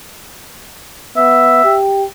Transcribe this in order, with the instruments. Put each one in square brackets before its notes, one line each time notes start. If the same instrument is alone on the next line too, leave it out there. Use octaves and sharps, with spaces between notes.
[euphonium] B3 [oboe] E5
[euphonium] G4